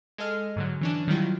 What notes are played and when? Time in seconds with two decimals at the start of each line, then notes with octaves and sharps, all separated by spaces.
0.18 G#3 A4 D#5 F6
0.56 G#2 D3 F#3
0.81 E3 C#4 D4
1.08 D#3 F#3 G3 E4 F4